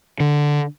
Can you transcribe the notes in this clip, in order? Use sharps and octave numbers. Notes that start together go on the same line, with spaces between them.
D3